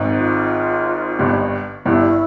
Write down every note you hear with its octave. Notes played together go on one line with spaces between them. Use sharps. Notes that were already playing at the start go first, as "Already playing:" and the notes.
Already playing: G#1 G#2
F4
G1 G2
G1 G2 E4